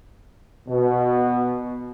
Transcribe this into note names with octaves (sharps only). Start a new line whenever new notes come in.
B2